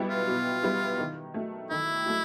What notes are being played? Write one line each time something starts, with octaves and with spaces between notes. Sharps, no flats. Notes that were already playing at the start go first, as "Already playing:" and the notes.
Already playing: B2 G3 B3 E4 G4
F4
B2
G3 B3 E4 G4
D#3
F#3 A3
D#3 E4
F#3 A3